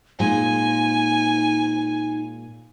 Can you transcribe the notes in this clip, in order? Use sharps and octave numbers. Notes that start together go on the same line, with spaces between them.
A#2 G#3 D#4 G#5